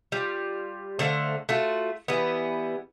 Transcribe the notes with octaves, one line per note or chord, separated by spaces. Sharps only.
G3 F4
D3 A3 C5 F5
A3 F4 F#4
E3 G3 B3